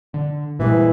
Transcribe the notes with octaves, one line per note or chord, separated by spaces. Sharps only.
D3
A#2 E3 G3 G#3